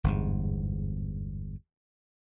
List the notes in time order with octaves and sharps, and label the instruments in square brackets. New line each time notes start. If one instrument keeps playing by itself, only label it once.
[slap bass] G1 E2 G#2